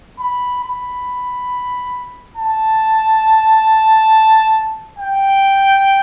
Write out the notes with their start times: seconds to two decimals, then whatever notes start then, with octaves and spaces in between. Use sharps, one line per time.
0.19 B5
0.64 B5
2.37 A5
4.99 G5